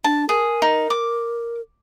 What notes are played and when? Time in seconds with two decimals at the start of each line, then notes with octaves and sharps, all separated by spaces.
0.04 D4 A5
0.29 G#4 A#4
0.62 D#4
0.90 D6